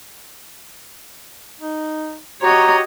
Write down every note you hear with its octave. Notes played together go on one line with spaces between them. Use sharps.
D#4
F#4 G4 C#5 D#5 A#5